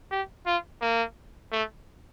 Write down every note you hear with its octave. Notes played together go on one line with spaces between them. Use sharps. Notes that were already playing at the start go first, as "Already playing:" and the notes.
G4
F4
A#3
A3